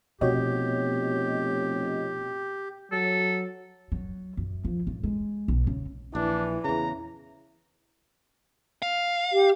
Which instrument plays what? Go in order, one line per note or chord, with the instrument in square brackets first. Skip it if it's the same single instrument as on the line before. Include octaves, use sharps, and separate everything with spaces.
[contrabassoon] F1 [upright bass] B2 [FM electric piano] F#4 C#5 D#5 [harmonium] G4
[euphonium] F#3 [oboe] A4
[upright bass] F#3
F#2
F3
G2
G#3
B1
C#3
[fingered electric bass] A#1 [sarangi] E3 [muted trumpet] D4
[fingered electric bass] E2 C#3 [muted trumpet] A#5
[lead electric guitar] F5
[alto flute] G4